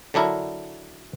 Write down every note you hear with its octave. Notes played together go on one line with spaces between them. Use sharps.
D3 F#3 D4 E4 A#4